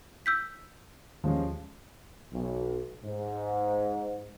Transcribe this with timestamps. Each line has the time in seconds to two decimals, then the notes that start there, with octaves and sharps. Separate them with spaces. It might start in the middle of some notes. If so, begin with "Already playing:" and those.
0.26 E6 G6 B6
1.24 D#2 F3 G#3 C#4
2.32 B1
3.04 G#2